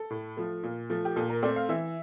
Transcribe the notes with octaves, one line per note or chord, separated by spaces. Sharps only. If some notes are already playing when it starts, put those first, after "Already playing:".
Already playing: A4
A2
F3 A3
A#2
F3 A3
G4
A#2 A4
A#4
A3 C4 D5
F5
E3 E5